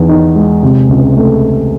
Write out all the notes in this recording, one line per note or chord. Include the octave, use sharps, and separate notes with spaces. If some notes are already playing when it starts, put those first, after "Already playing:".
Already playing: E2 D#3
D#4
G#3
C3
C#2
A3